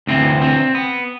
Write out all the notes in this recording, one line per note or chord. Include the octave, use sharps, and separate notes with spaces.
D2 C3 E3 C4
C4
B3